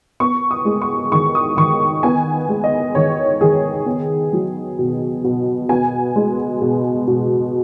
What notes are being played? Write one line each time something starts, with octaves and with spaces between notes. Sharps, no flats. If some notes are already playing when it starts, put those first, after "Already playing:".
B3 C#6
D#6
G#3
C#6
D#3 C#6
D#6
D#3 C#6
B3 G#5
G#3
D#5
D#3 C#5
D#3 G#4
B3
F#3
B2
B2
B3 G#5
G#3
B2
B2